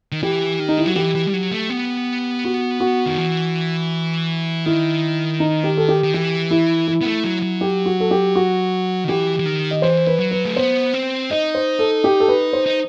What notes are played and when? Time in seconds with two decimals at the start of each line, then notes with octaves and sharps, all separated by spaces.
0.12 D#3
0.23 E3 G4
0.60 D#3
0.68 D#4
0.78 E4
0.86 F#3 F#4
0.96 E3 G4
1.15 E3
1.27 G3
1.33 F#3
1.52 A3
1.70 B3
2.45 F#4
2.80 F#4
3.06 D#3
3.18 E3
4.65 D#3 E4
5.40 D#4
5.64 G4
5.77 A4
5.89 G4
6.03 D#3
6.13 E3 G4
6.51 E4
6.87 E4
7.01 B3
7.05 A3
7.24 F#3
7.42 F#3
7.61 G4
7.86 F#4
8.00 A4
8.11 G4
8.36 F#4
9.04 D#3
9.09 E3 G4
9.39 E3
9.45 D#3
9.71 D#5
9.82 E3 C5
10.07 B4
10.19 F#3
10.31 B4
10.45 A3
10.56 B3 C5
10.94 C4
11.30 D#4 D#5
11.55 C5
11.79 A4
12.04 G4
12.20 A4
12.28 B4
12.53 C5
12.66 D#4